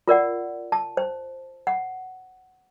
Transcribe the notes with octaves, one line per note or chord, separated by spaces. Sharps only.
F4 A#4 D5 F#5
A5
C5
F#5